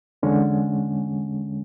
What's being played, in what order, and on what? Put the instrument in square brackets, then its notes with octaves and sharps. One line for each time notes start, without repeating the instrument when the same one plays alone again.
[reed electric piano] E2 D3 G#3 C#4